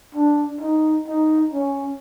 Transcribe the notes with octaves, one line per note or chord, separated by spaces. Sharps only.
D4
D#4
D#4
C#4